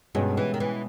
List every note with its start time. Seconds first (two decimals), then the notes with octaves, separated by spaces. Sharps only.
0.15 G2 B2 G#3 C#4 G#4
0.37 E3
0.54 D#3
0.60 E3